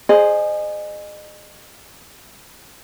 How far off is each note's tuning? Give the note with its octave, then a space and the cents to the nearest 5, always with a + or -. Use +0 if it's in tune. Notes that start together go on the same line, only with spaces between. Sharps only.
G#4 +0 C5 +0 D#5 -35